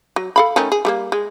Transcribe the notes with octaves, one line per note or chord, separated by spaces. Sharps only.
F#3
A4 F5 B5
D#3 A3 C#4
G#4
G3 A3 A#3
G#3